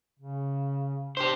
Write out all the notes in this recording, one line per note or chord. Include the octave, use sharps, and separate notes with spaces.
C#3
D4 G4 C5